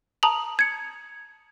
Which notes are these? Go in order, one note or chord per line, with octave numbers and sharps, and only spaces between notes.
A5 A#5 D#6 F7 F#7
G#6 C#7